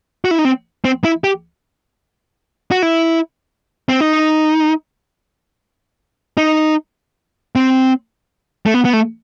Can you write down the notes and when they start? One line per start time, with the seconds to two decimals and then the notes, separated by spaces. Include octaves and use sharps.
0.25 F#4
0.31 E4
0.39 D#4
0.45 C4
0.85 C4
1.04 E4
1.24 G4
2.71 F#4
2.82 E4
3.89 C4
4.00 D#4
6.37 D#4
7.56 C4
8.66 A3
8.74 B3
8.85 B3
8.93 A3